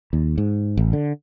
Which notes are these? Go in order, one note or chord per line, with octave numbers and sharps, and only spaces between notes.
D#2
G#2
A1
D3